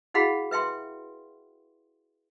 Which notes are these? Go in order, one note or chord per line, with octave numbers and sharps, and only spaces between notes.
E4 F#4 G#4 F5 F#5 B5
B4 E5 G5 C6